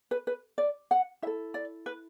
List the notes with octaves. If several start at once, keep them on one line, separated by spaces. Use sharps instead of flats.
B4
B4
D5
F#5
E4 A4 E5
D5
B4